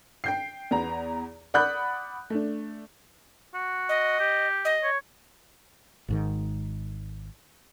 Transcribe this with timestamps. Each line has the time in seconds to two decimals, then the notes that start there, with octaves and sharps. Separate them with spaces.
0.24 G5 G6 C7
0.71 E2 B3 A#5
1.54 D5 F#5 B5 D#6 F#6 G6
2.30 A3 D4
3.54 F#4
3.89 D#5
4.20 G4
4.65 D#5
4.83 C#5
6.08 G#1 G#2 D#3